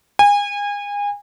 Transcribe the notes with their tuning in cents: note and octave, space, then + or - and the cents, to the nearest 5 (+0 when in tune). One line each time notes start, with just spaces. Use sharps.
G#5 -30